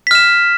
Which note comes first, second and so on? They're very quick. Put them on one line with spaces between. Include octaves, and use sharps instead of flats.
B6 F6 E7